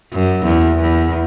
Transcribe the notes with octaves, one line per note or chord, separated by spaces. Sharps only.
F#2
E2
E2